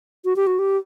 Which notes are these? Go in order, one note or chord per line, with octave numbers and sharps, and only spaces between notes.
F#4
G4
F#4
G4